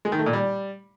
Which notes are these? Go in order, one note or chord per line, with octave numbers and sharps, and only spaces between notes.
G#3
D#3
A3
A#2
G3